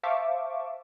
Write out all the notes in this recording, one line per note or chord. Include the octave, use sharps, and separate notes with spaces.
C5 E5 F5 A5 C#6 D6